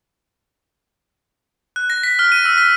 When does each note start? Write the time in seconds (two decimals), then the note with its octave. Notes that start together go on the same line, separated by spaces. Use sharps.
1.76 F#6
1.90 A#6
2.03 B6
2.19 F6
2.32 D#7
2.45 E6
2.58 B6